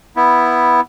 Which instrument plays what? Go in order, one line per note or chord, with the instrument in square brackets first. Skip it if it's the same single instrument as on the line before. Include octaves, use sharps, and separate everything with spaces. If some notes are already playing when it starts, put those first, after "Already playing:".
[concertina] B3 E4